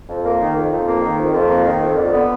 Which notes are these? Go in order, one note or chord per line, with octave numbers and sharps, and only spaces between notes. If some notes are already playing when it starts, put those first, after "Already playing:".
F2
A#3
D#3
F2
F2
A#3
D#3
F2
F2
A#3
D#3
F2
D3
B3